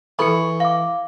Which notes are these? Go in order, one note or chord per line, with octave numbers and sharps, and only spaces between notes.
E3 A4 B5 C#6 C#7
F5 D6